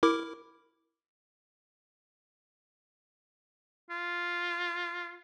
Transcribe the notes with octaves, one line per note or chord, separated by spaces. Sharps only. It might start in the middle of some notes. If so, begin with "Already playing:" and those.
E4 A#4 D6
F4